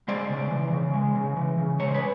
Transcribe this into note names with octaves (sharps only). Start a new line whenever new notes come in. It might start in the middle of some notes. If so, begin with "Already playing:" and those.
G#3 C5 D5
C#3
E3
C#3
G#3
C#3
E3
C#3
G#3 C#5
C5
B4 C#5